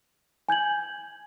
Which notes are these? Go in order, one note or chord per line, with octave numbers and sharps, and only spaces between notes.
G#5 G6 G#6 F#7